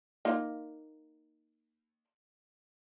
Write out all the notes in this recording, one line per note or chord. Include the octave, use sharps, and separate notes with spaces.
A#3 D#4 F4